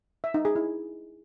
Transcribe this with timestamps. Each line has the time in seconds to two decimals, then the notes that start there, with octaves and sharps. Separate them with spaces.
0.24 E5
0.34 D#4
0.45 G#4
0.56 E4